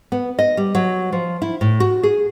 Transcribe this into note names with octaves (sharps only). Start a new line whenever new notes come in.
B3
D#5
G3
F#3
F3
E4
A2
F#4
G#4